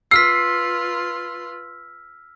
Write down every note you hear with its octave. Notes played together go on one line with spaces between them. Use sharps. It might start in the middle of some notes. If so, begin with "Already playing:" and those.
F4 B4 C6 E6 F6 B6 C7